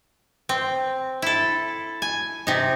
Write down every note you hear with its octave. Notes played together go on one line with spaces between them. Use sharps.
C4
E4 A4
G#5
C3 D#4